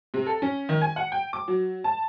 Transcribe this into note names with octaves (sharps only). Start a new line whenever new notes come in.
C3
A4
C#4
D#3
G#5
F#5
G5
D6
F#3
A5